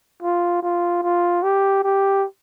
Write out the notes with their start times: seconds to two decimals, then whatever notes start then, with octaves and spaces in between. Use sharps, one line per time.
0.23 F4
0.63 F4
1.03 F4
1.43 G4
1.84 G4